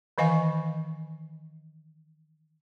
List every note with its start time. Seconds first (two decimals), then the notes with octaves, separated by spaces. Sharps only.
0.18 D#3 E3 D#5 F5 G#5 C#6